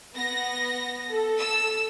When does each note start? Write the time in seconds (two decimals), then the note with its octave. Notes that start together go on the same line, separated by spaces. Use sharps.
0.14 B3 A#6
1.10 A4
1.39 E6